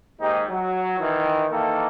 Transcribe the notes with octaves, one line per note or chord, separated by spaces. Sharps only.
D#2 G#2 D#4 G4
F#3
D#3 E3
D#3 E3 A#3 A4